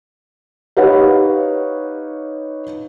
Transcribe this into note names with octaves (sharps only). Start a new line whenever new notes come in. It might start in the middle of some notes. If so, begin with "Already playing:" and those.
D#4 G4 B4 C#5 F5 F#5